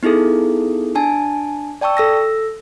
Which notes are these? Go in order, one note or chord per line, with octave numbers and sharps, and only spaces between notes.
B3 D#4 E4 G#4 A4
D4 G#5 A5
D5 G5 A5 C#6 E6
A4 E6 A#6